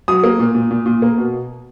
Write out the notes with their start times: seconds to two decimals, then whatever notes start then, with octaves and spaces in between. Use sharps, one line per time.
0.08 F#3 D#6
0.24 A#3
0.39 A#2
0.55 A#2
0.71 A#2
0.86 A#2
1.02 A#3
1.18 B2